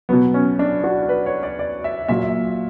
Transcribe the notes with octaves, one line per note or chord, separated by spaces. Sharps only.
B2 F#3 B3
C#4
D4
F#4
B4
C#5
D5
D5
E5
A#2 F#3 E5